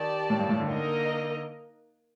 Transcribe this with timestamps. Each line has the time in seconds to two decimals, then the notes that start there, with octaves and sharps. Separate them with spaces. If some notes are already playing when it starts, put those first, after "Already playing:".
Already playing: D#3 G4 D5 A5
0.30 A2
0.39 G2
0.49 A2
0.60 D3
0.69 A#3 D#4 A#4 D#5